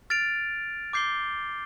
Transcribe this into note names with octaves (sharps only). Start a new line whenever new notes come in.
F6 A6 D7 F7
D6 G6 C7 G7